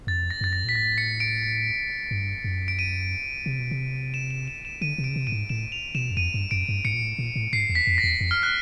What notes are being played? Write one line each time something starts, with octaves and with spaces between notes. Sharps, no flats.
F2 A6
A#6
F#2 A6
A#6
A#2 B6
A2 A#6
C#7
D7
G2
F#2
D7
D#7
C3
B2
C3
E7
E7
E7
E7
D3 D#7
C3
D7
C#3
C3
A2 D#7
G#2
A2 E7
F7
B2 E7
F#2
F2 D#7
G2
F#2 D7
G2
G#2 C#7
A#2
A2
A#2
A2
G#2 C7
E2
B6
F2
A#6
E2
F2
F6
F#6